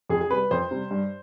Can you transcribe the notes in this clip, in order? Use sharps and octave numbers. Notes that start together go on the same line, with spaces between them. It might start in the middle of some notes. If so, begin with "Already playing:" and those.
F2 G#4
G#4
C3 G3 B4
F2 C5
C3 G3
G2